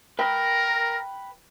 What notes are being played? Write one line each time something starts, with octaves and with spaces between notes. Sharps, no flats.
A#4 B4 G5